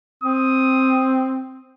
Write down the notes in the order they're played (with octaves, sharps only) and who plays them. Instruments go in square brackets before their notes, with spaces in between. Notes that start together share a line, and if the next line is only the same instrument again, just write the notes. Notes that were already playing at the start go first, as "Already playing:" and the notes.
[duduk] C4 [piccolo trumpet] D#6